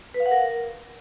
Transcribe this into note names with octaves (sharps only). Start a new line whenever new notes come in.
B4
F5
F#5
A#4